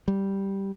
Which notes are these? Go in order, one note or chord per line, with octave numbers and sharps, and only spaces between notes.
G3